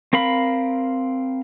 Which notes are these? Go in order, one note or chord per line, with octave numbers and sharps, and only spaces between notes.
C4 A#4 F5 B5